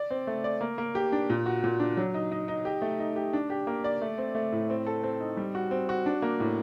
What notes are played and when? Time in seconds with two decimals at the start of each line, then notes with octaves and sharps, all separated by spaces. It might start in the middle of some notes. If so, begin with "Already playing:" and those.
Already playing: D5
0.11 C4
0.27 A3
0.44 D5
0.61 A#3
0.78 A#3
0.95 G4
1.12 D4
1.30 A#2
1.46 F#4
1.64 A#2
1.80 D4
1.97 F#3
2.14 D#4
2.31 D#4
2.48 D#4
2.65 G4
2.82 A3
2.99 D#4
3.16 G4
3.33 D4
3.50 G4
3.67 A#3
3.84 D5
4.01 A3
4.18 C4
4.35 A3
4.52 A2
4.70 C4
4.87 A4
5.03 C4
5.20 D#4
5.37 G3
5.55 F#4
5.71 C4
5.89 F#4
6.06 D4
6.22 A#3
6.40 A2